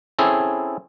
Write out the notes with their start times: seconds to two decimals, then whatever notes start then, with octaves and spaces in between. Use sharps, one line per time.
0.19 C4 C#4 E4 G#4 A4